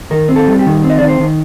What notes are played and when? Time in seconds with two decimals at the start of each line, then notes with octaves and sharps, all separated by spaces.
0.11 D#3 A#4
0.29 C4
0.36 A4
0.47 G3
0.59 G4
0.66 D#3
0.83 C4
0.90 D#5
0.99 D#3 D5
1.08 C5
1.20 D#3